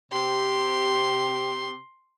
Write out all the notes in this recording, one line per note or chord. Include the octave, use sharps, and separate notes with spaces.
C3 G4 C6